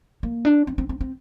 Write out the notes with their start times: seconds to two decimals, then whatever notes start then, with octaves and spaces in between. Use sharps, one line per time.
0.23 A#3
0.45 D4
0.67 C4
0.78 C4
0.89 C4
1.01 C4